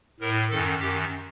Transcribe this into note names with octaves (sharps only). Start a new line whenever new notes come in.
A2 A#4
F#2 D#3 A4
F#2 D#3 G4